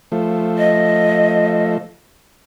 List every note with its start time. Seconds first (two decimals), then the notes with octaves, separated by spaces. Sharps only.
0.12 F3 A3
0.58 D#5